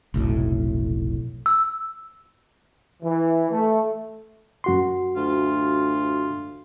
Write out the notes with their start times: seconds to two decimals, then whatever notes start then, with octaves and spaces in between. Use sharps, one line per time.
0.14 F1 B1 A2
1.46 E6
3.02 E3
3.51 A3
4.64 F#2 F#4 C6
5.16 D2 F4